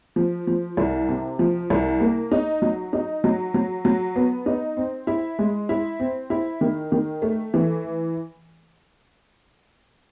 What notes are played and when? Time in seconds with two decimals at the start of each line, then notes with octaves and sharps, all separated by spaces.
0.16 F3
0.47 F3
0.77 C2
1.09 C3
1.39 F3
1.70 C2
2.00 A#3
2.31 D#4
2.62 F#3
2.93 D#4
3.24 F#3
3.54 F#3
3.85 F#3
4.16 B3
4.46 D#4
4.77 C4
5.07 E4
5.39 G#3
5.69 E4
6.00 C4
6.30 E4
6.61 D#3
6.92 D#3
7.22 A3
7.54 E3